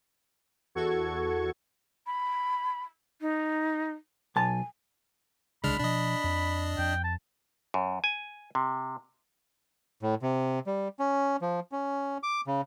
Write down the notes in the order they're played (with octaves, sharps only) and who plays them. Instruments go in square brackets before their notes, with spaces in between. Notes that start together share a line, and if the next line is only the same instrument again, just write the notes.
[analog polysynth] E2 F#4 A4 C#6 G#6
[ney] B5
D#4
[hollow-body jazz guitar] B1 A5 [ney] G#5
[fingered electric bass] D1 C2 C#3 [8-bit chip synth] G#3 D4 F6 [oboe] B5
[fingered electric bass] B2 F3 [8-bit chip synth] D4 D#5
[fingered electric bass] F2
[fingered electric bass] F2 [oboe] G5
[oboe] A5
[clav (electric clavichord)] F#2
G#5
C3
[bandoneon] A2
C3
G3
C#4
F3
C#4
D6
C#3